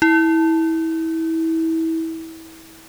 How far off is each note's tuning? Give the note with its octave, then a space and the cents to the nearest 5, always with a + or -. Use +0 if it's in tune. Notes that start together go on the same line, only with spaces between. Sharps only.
E4 -25